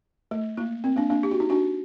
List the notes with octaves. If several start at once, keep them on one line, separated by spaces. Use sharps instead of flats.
A3
A#3
C4
A#3 D4
A#3 D4
G4
F#4
D#4
D4 F#4